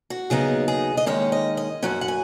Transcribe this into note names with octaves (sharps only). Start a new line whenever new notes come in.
F#4
D#2 C#3 F#3 B3 D#4 G#4
G#4
D#5
D#2 D#3 G#3 C#4 C#5
D#5
D#5
F#2 F#3 C#4 F#5
F#5
G#5